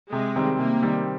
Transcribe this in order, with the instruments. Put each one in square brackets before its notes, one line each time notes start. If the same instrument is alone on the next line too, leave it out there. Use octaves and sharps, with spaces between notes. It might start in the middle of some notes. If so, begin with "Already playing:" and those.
[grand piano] C3 [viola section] G#3
[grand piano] D#3 G3 C4
[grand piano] C3 [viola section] A#3
[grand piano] D#3 G3 C4